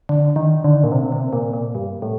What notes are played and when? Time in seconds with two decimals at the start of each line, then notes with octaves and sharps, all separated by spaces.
0.09 D3
0.36 D#3
0.64 D3
0.84 A#2
0.92 C3
1.12 C3
1.33 A#2
1.54 A#2
1.75 G2
2.02 A2